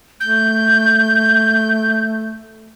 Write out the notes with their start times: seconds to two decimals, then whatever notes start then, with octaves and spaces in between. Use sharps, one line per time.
0.20 A3 G6